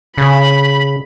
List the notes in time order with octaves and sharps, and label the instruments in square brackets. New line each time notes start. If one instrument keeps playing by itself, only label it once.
[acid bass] C#3 [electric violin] B5